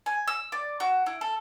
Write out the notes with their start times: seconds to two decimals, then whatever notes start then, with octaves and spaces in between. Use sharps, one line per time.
0.06 G#5
0.27 E6
0.52 D5
0.80 F#4
1.06 E4
1.21 A4